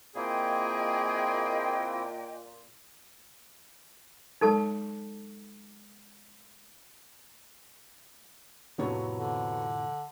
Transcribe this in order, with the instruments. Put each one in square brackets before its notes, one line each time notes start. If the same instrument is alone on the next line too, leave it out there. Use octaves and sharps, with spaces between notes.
[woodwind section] A#2 [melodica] A#3 C4 E4 [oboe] G#4 [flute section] D#5 G5 G#5
[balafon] F#3 G#3 [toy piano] D#4 A4 A5
[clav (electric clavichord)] F2 A2 C3 [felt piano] F#3 B3 C#5
[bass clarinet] D3